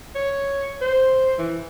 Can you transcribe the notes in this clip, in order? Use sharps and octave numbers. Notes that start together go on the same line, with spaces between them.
C#5
C5
E3